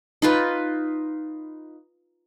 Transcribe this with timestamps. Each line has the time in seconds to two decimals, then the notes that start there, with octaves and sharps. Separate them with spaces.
0.22 D#4 F4 B4